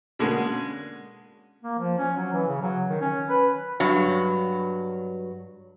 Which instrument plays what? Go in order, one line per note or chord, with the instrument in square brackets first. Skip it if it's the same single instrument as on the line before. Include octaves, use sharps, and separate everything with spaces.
[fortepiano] B2 D3 G#3 A#3 C#4
[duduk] A#3
F3
C#4
F#3
E3
C#3
F#3
D#3
C#4
B4
[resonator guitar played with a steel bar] G2 F#3